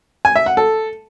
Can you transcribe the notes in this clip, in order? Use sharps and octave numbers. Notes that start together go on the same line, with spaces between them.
G#5
E5
F#5
A4